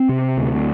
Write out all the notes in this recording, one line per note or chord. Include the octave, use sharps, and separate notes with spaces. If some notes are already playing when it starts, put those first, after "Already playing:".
Already playing: C4
C3
D2